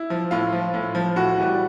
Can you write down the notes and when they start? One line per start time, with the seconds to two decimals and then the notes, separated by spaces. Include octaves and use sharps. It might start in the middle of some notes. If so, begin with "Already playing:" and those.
Already playing: E4
0.10 F3
0.31 A2 F4
0.53 F3
0.74 A2
0.95 F3
1.16 A2 F#4
1.37 E3 G3